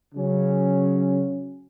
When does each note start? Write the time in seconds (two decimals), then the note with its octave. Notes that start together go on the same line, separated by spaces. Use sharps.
0.14 C#3 F#3 C#4